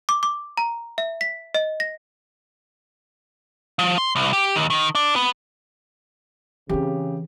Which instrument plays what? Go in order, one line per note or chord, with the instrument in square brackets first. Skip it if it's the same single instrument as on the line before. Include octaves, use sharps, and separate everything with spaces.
[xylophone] D6
D6
A#5
E5
B6
D#5
A#6
[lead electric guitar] F3
C6
C2
G4
D#2
D#3
D4
B3
[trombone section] C#3 [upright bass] E3 C4 [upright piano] G4